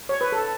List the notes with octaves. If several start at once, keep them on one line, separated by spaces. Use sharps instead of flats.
C#5
B4
A4